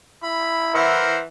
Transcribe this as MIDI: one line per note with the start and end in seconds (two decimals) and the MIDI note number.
0.23 1.05 64
0.23 0.74 83
0.75 1.24 52
0.75 1.18 70
0.75 1.18 72
0.75 1.18 78